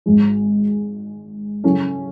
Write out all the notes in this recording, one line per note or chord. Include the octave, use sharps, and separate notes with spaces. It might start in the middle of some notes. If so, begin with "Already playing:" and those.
G#1 G#2 G#3
C#3 F#3 C#4 E4 A4